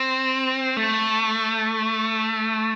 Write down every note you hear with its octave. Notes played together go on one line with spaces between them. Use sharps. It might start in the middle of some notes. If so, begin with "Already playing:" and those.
Already playing: C4
A3